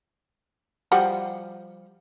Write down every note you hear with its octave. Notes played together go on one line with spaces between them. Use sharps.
F3 G3 F#4